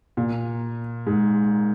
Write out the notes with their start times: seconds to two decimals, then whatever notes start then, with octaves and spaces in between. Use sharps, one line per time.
0.17 A#2
1.07 G#2